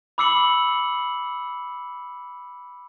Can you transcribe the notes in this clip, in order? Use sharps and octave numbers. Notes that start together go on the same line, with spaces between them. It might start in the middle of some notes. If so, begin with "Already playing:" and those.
B5 D6 E6 C7 C#7 F#7